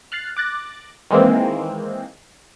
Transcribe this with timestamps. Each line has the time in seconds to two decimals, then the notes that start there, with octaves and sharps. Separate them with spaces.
0.12 F6 F#6 A6 C7
0.37 D6 F#6 A6 A#6
1.11 D#3 E3 G#3 A#3 C4